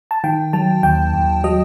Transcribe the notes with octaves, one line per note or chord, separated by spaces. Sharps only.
A5
D#3 G5
F#3 A5
D#2 G5
D#2
F#3 D#5